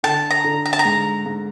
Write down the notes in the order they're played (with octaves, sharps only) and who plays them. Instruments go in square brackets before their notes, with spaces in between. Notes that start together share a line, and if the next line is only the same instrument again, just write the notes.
[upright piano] D3 [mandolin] A5
[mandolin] A#5
[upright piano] D3
[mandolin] A#5
A5
A#5
[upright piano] G#2
G#2